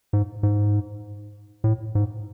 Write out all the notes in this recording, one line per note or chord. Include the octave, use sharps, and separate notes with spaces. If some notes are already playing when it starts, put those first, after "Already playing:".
G#2
G#2
A2
G#2